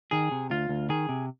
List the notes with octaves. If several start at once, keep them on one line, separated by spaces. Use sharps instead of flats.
D#3 G#4
C3
D2 F4
D2
D#3 G#4
C3